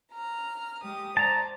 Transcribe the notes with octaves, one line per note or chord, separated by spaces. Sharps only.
A#5 F6
G#3 G4 D#6
C5 D5 A5 A#5